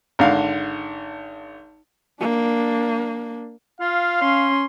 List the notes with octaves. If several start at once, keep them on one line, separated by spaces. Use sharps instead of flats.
G#1 D3 F5
A#3 D4
F4 F5
C#4 C6